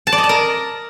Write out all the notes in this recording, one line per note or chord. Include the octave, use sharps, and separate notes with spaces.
A5
D5
D#5
A5
A#4